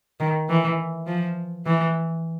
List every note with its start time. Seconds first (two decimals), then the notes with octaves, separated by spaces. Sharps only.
0.20 D#3
0.49 E3
1.07 F3
1.66 E3